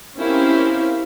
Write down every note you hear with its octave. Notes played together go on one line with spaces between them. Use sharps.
C4 C#4 E4 G4 A#4 F5